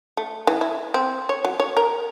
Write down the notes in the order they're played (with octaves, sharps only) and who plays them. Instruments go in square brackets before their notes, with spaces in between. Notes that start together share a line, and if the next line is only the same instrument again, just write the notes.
[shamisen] A3
E3
E4
C4
C#5
F#3
C#5
A#4